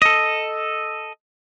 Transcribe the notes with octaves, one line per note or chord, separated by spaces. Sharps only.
A4 D#5